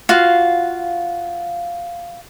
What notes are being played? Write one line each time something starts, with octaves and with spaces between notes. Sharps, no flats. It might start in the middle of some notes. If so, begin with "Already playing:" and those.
F4 F#4 F5